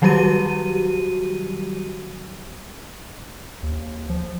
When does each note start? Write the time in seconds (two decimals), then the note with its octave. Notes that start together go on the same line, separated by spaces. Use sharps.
0.02 D#3 F#3 G3 F#4 G4 D#7
3.63 D#2
4.10 F3